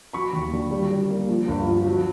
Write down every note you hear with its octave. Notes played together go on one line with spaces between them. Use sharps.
F#3 B5 C#6
D#2
D3
G3
G3
A#3
F3
G1
F3
F#3